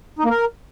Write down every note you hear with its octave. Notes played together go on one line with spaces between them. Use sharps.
D#4
A#3
A#4